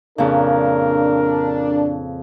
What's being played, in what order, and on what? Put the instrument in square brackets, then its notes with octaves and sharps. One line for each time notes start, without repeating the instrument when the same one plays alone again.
[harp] F2 A#2 C#3 [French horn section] D4 [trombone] A#4